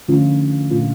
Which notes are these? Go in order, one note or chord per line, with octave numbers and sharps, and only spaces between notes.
D3 F3 A3 C#4 F4
A#2 A3 D4 F4